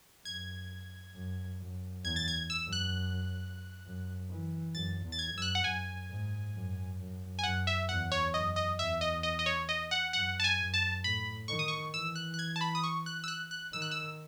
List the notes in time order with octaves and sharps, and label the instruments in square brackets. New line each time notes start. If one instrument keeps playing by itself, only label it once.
[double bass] F#2 [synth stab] G#6
[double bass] F#2
F#2
[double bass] E2 [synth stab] G#6
[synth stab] A6
G#6
E6
[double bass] F#2
[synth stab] F#6
[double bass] F#2
E3
[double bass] F#2 [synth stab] A6
[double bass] E2
[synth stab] A6
G#6
[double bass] F#2 [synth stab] E6
[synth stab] F#6
F#5
[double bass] F#2 [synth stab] G#5
[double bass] G#2
F#2
F#2
[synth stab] G#5
[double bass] F#2 [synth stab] F#5
[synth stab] E5
[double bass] E2 [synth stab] F#5
[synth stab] C#5
[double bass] F#2 [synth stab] D#5
[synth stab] D#5
[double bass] E2 [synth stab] E5
[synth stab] D#5
D#5
D#5
C#5
D#5
F#5
[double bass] F#2 [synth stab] F#5
[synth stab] A5
G#5
[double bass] F#2
[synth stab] A5
[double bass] A2 [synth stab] B5
[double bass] D#3 [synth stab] C#6
[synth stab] D#6
C#6
[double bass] E3 [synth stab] E6
[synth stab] F#6
F#6
G#6
A5
B5
D#6
C#6
F#6
E6
F#6
F#6
[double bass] D#3 [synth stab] E6
[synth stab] F#6
E6